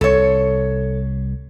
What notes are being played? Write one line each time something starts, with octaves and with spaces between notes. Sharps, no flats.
C2 A4 C#5